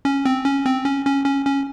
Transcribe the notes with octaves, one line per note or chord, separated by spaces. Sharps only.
C#4
C4
C#4
C4
C#4
C#4
C#4
C#4